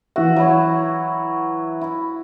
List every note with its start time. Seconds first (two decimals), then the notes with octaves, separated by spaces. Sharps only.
0.16 E3 F#4 E5
0.36 F#3 E4 C#5
1.81 E4